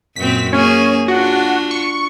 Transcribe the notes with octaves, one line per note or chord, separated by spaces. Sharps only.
F#2 A#2 C4 B6
A#3 C#4 G#4
D4 F4 F#4
C#6